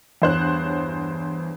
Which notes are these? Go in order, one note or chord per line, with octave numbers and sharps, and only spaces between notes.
E2 G2 C5 C#5 F#6